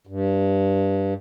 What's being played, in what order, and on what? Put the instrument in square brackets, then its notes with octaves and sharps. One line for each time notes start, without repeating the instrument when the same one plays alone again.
[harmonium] G2